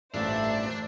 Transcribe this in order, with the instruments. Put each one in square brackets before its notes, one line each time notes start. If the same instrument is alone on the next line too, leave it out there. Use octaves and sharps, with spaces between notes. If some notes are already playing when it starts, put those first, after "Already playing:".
[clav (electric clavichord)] A1 G2 A#2 [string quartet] A3 C5 [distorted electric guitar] D4 [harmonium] D5 E5